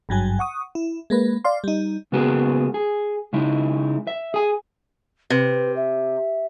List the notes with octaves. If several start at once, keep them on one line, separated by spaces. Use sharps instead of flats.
G#1 G2 F#3 G#5
F#5 C#6 D#6
E4
G#3 A#3 B4
D5 F5 C6
G3 D#4
C#3 G#3 A#3 B3 F#4 G#4
G#4
C#3 G#3 D#4 E4
E5
G#4 G#5
C3 B4
E5